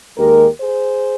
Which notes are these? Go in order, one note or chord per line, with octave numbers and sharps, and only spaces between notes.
D#2 D#3 G#3 G4 A#4
G#4 C5